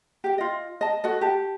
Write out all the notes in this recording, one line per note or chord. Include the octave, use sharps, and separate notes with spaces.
G4 G5
F4 D#5
D#5 A5
F#4 A4 D#5
G4 A5